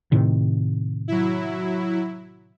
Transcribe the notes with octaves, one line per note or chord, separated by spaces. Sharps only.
A2 C3 D#3
F#3 E4